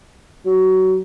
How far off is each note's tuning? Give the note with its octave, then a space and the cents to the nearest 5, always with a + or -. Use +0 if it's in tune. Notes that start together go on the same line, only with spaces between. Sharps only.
F#3 +20